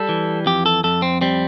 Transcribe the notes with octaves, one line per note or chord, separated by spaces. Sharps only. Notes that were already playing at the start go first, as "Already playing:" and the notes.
Already playing: G3 A4
E3
F2 G4
A4
F2 A4
C4
G3 C4